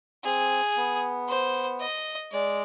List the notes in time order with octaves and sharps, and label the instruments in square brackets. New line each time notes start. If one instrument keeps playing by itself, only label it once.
[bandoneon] C4 [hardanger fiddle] G#4
[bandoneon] B3
[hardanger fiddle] C5
D#5
[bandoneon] G#3 [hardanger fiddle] D5